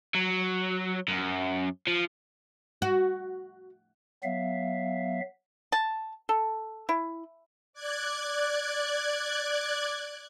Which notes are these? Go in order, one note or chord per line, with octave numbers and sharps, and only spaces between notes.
F#3
F#2
F3
F#4
F#3 B3 E5 F5
A5
A4
E4
D5 F#6 G#6